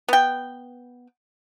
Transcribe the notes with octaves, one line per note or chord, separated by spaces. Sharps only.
B3 G5